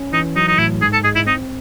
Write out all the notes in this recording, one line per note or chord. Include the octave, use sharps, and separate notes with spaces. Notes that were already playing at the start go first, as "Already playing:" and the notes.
Already playing: C#4
E3 D#4
F#3 D#4
D#4
A2 E4
G#2 G#4
A4
G#3 G#4
E4
C4 D#4